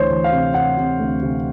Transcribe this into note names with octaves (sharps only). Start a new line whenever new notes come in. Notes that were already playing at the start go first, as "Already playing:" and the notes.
Already playing: D2 E3 C5 C#5
E3
F5
C3
C3 F#5
C3
D2
C3